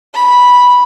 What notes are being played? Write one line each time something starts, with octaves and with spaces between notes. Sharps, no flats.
B5